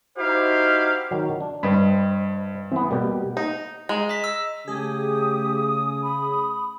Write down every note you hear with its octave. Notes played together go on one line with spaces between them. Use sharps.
D#4 E4 F#4 G4 C5 F5
D#3 F#3
D4
G2 C5 D#5 B5
E3 B3 C4
B2 G3 A#3 G4
D#4
G#3 A#5
D#5 B6
E6
C#3 A3 G4 G#4 D#6
B5